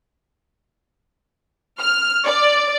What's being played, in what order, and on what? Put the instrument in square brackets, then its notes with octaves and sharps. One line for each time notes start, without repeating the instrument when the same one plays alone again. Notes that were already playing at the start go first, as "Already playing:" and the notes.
[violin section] F6
D5